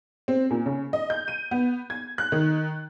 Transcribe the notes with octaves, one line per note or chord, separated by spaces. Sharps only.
C4
A#2
C#3
D#5
G6
D#7
B3
G#6
F#6
D#3